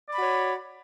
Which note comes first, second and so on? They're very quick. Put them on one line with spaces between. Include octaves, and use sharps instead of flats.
D5 B5 F#4 C#5